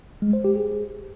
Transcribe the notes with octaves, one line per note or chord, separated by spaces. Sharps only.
G#3
C5
G4
G#4